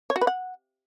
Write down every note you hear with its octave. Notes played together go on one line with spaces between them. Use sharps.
C#5
F#4
B4
F#5